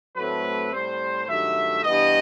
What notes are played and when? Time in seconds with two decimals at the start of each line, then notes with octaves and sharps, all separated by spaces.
0.15 A2 F#3 A3 C4 B4
0.72 A2 G3 C4 C5
1.28 G2 D#3 F#3 A3 E5
1.84 G2 E3 B3 D#5